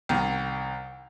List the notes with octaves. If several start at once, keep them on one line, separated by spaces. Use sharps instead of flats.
C2 D#3